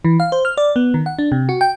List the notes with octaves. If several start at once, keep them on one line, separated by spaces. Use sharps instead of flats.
E3
F5
C5
F6
D5
B3
D#3
F#5
D4
C3
F#4
G5